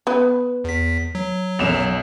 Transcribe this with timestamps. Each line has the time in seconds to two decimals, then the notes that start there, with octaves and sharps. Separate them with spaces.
0.07 B3 B4
0.64 E2 B6
1.15 F#3
1.59 B1 F#2 E7 F7